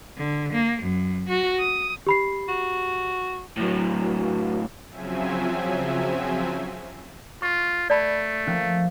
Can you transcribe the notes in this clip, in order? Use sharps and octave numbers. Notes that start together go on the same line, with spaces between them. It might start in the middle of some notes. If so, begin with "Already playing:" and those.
D3
A#3
F#2
F#4
D#6
G4 B5 C7
F#4
A2 F#3
C#3 F3 F#3 C4 E5 G#5
F4 C#6
A3 D5 A5 B5
F3 A#3 C#4